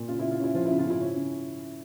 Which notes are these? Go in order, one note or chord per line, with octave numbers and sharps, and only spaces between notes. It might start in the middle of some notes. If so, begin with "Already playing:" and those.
Already playing: A#2
C#3 F4
C#3 E4
F4
C#4 E4
F3 F4
E4
C#3
F4
C#3 E4
C#4
C#3